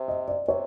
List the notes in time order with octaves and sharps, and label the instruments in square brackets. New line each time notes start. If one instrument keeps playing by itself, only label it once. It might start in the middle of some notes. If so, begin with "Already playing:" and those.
Already playing: [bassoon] C3
[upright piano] D#5
D5
[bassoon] C3 [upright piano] C#5